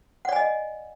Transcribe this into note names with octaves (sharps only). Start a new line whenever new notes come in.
D5 D#5 F#5 G#5